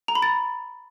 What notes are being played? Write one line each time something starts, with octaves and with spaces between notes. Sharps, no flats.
A#5
B5
A6